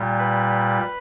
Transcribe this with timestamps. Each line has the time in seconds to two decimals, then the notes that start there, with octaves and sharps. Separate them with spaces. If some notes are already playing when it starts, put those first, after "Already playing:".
Already playing: A#2 G3
0.19 B4